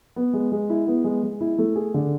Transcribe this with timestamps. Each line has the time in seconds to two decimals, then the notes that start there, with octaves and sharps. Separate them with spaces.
0.16 B3
0.33 G#3
0.52 G#3
0.70 E4
0.87 B3
1.04 G#3
1.23 G#3
1.41 E4
1.58 A3
1.76 G#4
1.94 D3